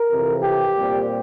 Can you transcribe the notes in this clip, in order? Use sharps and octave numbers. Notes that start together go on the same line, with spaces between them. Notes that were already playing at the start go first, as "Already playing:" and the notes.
Already playing: A#4
F2 C3 E3
G4
A#2 G3 C4